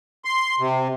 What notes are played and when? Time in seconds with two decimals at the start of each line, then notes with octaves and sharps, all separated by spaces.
0.25 C6
0.59 C3